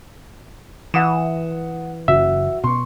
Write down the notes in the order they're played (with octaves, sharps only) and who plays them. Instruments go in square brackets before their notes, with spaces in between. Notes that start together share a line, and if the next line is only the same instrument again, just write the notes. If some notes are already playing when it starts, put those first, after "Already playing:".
[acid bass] E3 [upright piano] F#5 D#6 E7
[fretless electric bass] F#1 C#3 [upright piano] F#4 [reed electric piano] E5
[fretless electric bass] B2 [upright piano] C6 C#6